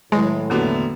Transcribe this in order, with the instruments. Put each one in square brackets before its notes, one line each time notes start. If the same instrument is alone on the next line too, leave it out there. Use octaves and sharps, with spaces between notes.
[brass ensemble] A2 [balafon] D#3 F#3 E4 [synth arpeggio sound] G#3
[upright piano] E1 D3 B3 [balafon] A#3 F#4 G4